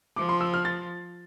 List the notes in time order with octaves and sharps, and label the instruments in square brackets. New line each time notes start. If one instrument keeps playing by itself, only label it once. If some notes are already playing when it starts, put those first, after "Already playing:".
[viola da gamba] F3 [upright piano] D6
[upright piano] C6
E6
F6
A6